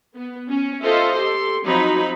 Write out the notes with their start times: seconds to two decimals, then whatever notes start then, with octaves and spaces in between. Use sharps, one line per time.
0.16 B3
0.50 C#4
0.83 F4 A4 C5 D#5 E5
1.16 G4 A4 C6
1.66 F3 F#3 C4 D#4 B5